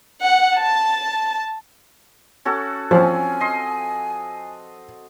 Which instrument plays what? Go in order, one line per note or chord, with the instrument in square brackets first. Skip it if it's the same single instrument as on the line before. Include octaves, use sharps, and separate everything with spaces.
[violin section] F#5
A5
[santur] C#4 F#4 A4
[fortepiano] F3 [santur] C4 C#4 [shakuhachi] G#5
[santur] D#5 C6